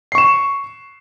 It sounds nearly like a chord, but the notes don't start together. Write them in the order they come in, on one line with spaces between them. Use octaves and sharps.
C7 C#6 E7